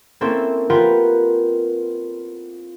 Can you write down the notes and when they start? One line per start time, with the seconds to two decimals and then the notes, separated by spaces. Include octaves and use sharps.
0.21 A#3 C4 C#4 E4 A4 C5
0.70 B3 C4 F4 G4 A#4 B4